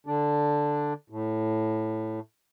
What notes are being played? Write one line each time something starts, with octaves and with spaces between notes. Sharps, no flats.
D3 D4
A2